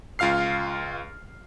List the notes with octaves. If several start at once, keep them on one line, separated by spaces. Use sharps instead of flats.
C#2 F4 F5 F6 C7